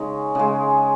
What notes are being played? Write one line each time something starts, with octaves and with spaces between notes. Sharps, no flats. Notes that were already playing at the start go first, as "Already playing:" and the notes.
Already playing: C#3 G#3 C#4 D#4
C#3 G#3